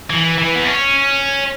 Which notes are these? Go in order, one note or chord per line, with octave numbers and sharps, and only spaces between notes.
E3
E3
B3
C#4